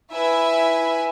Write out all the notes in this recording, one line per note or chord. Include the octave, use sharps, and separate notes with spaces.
E4 B4 E5 G#5